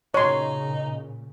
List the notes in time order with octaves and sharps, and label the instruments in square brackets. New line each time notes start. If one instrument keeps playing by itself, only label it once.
[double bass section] A#2 C#3 [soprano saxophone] D#4 [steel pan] C#5 C6